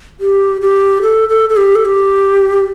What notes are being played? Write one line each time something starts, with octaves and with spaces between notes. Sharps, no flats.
G4
G4
A4
A4
A4
G4
A4
G4